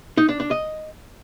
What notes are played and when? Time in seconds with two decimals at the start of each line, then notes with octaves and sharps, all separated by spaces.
0.17 D#4
0.29 D4
0.40 D4
0.51 D#5